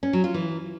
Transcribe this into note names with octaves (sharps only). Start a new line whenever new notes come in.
C#4
F#3
F4
E3